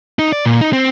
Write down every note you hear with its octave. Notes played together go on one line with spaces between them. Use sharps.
D#4
D5
A#2
D#4
C4